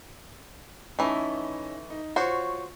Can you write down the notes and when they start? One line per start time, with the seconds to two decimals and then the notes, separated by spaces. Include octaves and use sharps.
0.99 E3 A3 C#4 D#4 E4
1.90 D#4
2.16 F4 F#4 C5 C#5 C#6